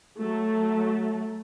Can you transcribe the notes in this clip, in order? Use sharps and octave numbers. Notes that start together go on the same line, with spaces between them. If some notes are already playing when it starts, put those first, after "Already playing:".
F#3 A3